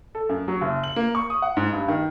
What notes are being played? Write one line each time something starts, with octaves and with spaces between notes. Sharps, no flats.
A4
F#2
F#3
F#1
F#7
A#3
C#6
D#6
F#5
G#2
G2
D#3